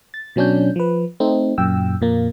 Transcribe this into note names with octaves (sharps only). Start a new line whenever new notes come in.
A6
B2 F#3 C#4 D4 G6
F3 B4
A3 C4 D#4
F#2 A#2 G5 E6
F2 A#2 A#3